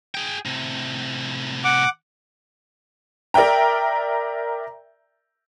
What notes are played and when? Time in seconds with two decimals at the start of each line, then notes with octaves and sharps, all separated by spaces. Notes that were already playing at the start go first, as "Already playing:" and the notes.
0.15 G#4 G5
0.46 A2 C3
1.64 F#5 D6
3.34 A#4 D5 E5 G5 A#5